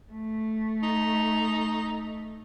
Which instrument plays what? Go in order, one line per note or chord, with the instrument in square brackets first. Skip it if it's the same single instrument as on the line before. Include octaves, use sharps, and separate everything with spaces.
[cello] A3
[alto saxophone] D#4